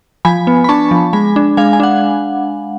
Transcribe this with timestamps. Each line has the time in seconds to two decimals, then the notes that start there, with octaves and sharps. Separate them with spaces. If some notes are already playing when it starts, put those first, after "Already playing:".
0.25 F3 G#5 B5
0.47 B3
0.64 B5
0.69 D4 A5 C#6
0.91 F3
1.13 G#3 G#5 B5
1.36 D4
1.57 G#3 F5 G#5
1.73 G#5
1.80 D4 F#5